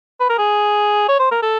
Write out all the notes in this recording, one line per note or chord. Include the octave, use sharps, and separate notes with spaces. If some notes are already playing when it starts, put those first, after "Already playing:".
B4
A#4
G#4
C#5
C5
A#4
A4